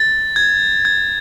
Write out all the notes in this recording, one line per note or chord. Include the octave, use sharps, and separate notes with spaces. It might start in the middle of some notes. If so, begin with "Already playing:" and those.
Already playing: A6
G#6
G#6